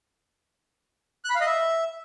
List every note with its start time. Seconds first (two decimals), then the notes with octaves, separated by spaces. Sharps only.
1.25 F#6
1.30 B5
1.35 F5
1.41 D#5
1.46 E5